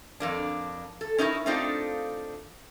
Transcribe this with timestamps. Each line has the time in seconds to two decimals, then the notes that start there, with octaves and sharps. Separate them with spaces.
0.20 F2 A#3 D4
1.01 A4
1.18 C#4 D#4 E4 F#4 A#4
1.46 A3 A#3 C4 D4 D#4 F4